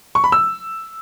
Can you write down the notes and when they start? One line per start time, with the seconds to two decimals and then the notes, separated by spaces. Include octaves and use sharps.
0.15 C#6
0.24 B5
0.32 E6